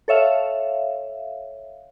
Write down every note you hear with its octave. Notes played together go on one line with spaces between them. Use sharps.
A4 C#5 E5 F5